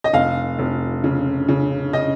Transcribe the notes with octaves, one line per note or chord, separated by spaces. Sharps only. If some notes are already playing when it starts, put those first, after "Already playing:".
D#5
F1 F5
F1
C#3
C#3
D#5